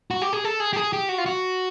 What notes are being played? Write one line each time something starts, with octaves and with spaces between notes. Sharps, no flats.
F#4
G4
G#4
A4
G#4
G4
G#4
G4
F#4
F4
F#4